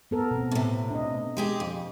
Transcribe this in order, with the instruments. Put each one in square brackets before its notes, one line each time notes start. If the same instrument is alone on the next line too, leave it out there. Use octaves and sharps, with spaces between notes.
[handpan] B3 A4 A#4
B2 C4
[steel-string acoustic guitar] A2 C3
[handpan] D4 D#5
[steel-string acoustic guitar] G#3 G4 G#4
F2